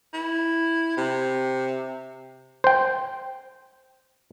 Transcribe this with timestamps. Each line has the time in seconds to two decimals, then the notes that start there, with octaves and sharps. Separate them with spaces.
0.13 E4
0.97 C3
2.64 C5 G5